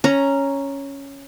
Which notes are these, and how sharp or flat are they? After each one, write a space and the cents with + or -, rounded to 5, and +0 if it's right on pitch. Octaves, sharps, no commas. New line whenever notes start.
C#4 +0 A#5 +0